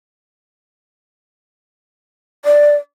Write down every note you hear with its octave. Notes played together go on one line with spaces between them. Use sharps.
D5